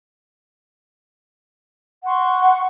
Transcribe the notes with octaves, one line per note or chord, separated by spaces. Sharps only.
F#5 C6 C#6